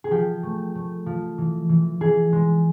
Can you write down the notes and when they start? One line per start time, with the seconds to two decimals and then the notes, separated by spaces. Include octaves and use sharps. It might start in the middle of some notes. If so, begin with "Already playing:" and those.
0.04 G#4
0.11 F3 G4
0.43 A3
0.75 A3
1.06 F3
1.38 E3
1.69 E3
2.01 E3 G#4
2.33 G#3